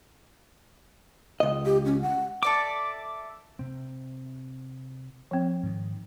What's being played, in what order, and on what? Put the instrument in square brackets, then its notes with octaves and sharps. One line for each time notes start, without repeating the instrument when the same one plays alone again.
[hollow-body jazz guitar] C#2 D#5
[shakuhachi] G4
C#4
F#5
[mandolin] A4 D5 E5 [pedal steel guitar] D6
[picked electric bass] C3 C4
[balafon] F3 C4
[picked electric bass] G#2 D#3